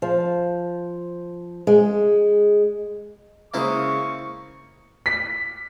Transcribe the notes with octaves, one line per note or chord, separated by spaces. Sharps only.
F3
G#3
C#3 G#3 A#3 E4 C5 C#6 D#6
B6